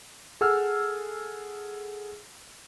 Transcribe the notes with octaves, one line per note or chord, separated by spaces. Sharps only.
G#4 A4 F#5 E6 F6